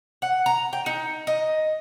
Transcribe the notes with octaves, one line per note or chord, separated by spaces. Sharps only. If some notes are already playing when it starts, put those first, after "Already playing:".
F#5
A#5
G5
D#4
D#5